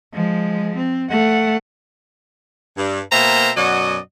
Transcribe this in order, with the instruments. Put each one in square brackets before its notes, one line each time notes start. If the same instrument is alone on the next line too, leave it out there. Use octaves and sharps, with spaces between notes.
[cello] F3 G#3
C4
A3 F#5
[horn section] G2
B2 A#3 C5 E5 G5 A#5
F#2 B2 F#3 F#4 D5 D#5